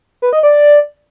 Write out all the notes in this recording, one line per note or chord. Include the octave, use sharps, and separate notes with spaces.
B4
D#5
D5